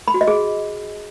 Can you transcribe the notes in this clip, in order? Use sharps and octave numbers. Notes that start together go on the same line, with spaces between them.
B5
F#4
D#5
G#4